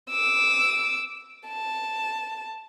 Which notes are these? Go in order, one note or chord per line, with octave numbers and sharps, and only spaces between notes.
D6 E6
A5